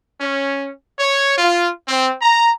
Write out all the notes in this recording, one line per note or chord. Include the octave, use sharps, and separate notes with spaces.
C#4
C#5
F4
C4
A#5